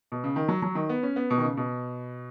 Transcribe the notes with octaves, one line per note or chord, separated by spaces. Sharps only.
B2
C#3
D#3
F#3
F#3
D#3
B3
C#4
B3
B2
D#3
C#3
B2